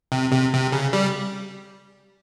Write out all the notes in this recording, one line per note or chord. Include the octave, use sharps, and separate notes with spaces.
C3
C3
C3
C#3
G3